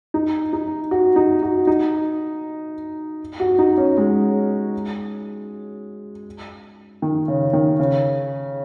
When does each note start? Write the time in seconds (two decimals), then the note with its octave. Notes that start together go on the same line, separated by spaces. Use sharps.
0.14 D#4
0.53 D#4
0.91 F#4
1.16 D#4
1.43 F#4
1.67 D#4
3.40 F#4
3.58 D#4
3.77 C#4
3.97 G#3
7.02 D#3
7.28 C#3
7.53 D#3
7.79 C#3